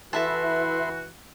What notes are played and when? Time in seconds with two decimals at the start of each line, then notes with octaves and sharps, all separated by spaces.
0.13 E3 E4 F#4 A4 B4 E5 A5 C6